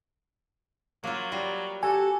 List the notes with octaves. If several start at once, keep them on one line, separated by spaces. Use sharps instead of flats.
F#3 A#3 F4
G3 F4 A#4
F#4 G4 A4 G#5